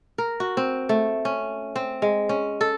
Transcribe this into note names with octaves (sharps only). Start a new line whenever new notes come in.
A#4
F#4
C4
A3
C#4
C4
G#3
C#4
A4